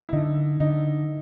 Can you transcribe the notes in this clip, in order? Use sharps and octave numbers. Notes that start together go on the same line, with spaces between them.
E4
D3 D#4
D3 D#4